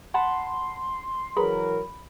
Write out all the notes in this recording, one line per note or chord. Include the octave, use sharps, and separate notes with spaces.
F#5 A5 B5 C6
E3 F#3 G#4 A#4 B4 A#5 B5